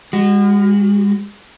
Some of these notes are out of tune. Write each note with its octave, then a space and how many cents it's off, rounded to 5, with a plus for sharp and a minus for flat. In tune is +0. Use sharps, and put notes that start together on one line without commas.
G#3 -40 F#4 +10